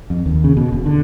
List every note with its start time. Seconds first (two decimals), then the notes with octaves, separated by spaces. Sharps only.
0.10 F2
0.26 D#2
0.44 C#3
0.57 B2
0.72 E1
0.86 D3